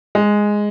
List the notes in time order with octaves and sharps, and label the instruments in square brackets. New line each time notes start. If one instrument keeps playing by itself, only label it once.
[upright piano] G#3